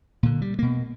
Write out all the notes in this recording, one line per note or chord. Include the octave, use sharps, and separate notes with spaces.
A#2 D3
G3
B2 A#3